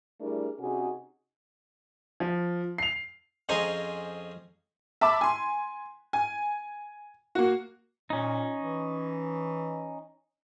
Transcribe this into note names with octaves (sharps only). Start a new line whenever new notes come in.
G3 A3 D4 E4 G#4 A#4
C3 C#4 D#4 F#4 G#4
F3
C7 F7
F2 C#4 G#4 C5 D#5 A#5
E5 A5 B5 D6 E6
G#5 C6
G#5
A#3 F#4
A#2 C#4 D#4
E3